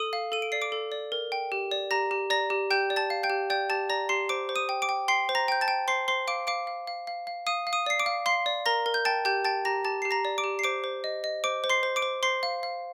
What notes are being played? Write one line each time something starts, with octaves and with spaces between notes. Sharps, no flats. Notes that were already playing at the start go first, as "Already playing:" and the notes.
Already playing: A4 D#6 D#7
F5
A4 D#7
D7
D5 C7
D6 D7
A4
D5
A#4
G5
G4
D5
G4 A#5 A#6
G4
D5 A#5 A#6
G4
G4 G5 G6
D5
A5 A6
F5
G5 G6
G4
D5 G5 G6
G4 A5 A6
D5 A#5 A#6
G4 C6 C7
C5 D6 D7
C5
D#6 D#7
G5
D6 D7
G5
G5 C6 C7
C5
A#5 A#6
G5 G6
A5 A6
G5
C5 C6 C7
C5 C6 C7
F5 D6 D7
F5 D6 D7
F5
F5
F5
F5
F5 D#6 D#7
F5
D#6 D#7
D5 C7
D6 D7
F5
F5 C6 C7
D5
A#4 A#5 A#6
A#4
G6
G5 A5 A6
G4 G5 G6
G5 A5 A6
G4 A#5 A#6
G4 A5 A6
G4 C7
A#5 A#6
D5
D6 D7
G4
C7
C5 D6 D7
C5
D#5
D#5
C5 D6 D7
C5
C6 C7
C5
D6 D7
C5
C5 C6 C7
F5
F5